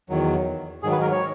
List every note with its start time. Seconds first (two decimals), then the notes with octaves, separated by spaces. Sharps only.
0.09 E2 D#3 F#3
0.83 G#2 D#3 F#3 G#4
0.92 B4
1.02 A#4
1.11 C#5